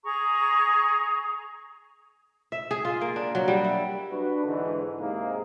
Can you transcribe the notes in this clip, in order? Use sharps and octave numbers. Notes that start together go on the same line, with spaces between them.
G#4 A#5 C#6
E5
G#4
F4
A#3
D4
F#3
G3
E4
D4 F#4 B4
G#2 D3 E3
D#2 G#2 C3 D#3 A#3 G#4